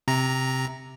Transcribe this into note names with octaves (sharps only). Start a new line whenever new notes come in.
C3 A#5